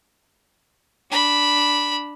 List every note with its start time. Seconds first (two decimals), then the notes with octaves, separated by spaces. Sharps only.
1.11 D4 B5